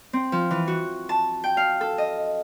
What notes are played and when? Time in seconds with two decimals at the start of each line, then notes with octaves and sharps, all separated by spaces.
0.13 C4
0.32 F3
0.51 E3
0.68 F#4
1.09 A5
1.44 G5
1.57 F5
1.81 A4
1.98 D#5